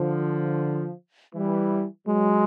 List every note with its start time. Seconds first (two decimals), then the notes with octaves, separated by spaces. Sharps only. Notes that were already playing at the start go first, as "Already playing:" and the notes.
Already playing: D3 F3
1.35 E3 G3
2.07 F#3 G#3